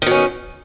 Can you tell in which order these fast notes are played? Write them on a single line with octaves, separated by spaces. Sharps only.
D#3 B2 C#4